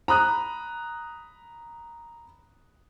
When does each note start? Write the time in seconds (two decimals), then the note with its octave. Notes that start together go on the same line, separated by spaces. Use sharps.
0.08 A#5 B5 D#6 F#6